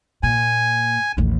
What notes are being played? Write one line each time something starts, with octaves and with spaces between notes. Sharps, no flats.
A#2 G#5
A1 D#2